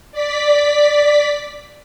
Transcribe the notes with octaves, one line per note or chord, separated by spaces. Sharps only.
D5 B6